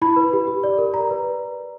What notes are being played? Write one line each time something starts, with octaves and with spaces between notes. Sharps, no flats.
E4 B5
B4
G4
G4
D5
A#4
D5 A#5
B4